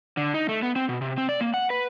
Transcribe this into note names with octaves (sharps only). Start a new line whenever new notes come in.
D3
D#4
A3
B3
C4
B2
C3
C4
D5
A#3
F#5
B4